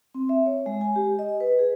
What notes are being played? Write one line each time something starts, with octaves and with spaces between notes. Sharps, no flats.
C4
E5
C#5
G#3
G#5
G4
D#5
B4
G#4